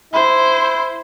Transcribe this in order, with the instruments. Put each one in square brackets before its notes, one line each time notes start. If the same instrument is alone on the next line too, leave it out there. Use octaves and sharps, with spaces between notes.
[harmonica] E4 [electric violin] C5